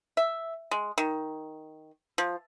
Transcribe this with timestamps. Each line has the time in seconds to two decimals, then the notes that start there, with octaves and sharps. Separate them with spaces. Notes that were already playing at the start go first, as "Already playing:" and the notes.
0.17 E5
0.71 G#3
0.98 D#3
2.18 F3